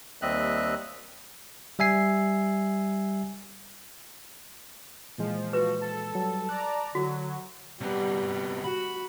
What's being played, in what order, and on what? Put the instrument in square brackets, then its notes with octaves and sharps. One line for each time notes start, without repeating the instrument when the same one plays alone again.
[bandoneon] D#2 G3 C4 D#5 E5 F#6
[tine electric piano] G3 E5 G#5 C7
[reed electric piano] A#2 E3 G#3 [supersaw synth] F3
[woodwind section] F#4 [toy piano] B4
[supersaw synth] A4 [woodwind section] A5
[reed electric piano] F#3 G3
[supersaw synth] D5 A#5 [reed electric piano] F#6
[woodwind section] D3 [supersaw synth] F#3 [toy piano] F#4
[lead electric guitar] C3 B3 [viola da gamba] G3
[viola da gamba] F#4 [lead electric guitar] B5